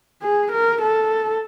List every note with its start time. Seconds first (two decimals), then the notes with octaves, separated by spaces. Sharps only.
0.22 G#4
0.52 A#4
0.82 A4